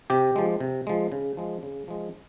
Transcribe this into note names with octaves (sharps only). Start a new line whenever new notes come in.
C3 G4
F3 G#3
C3
F3 G#3
C#3
F3 G#3
C#3
F3 G#3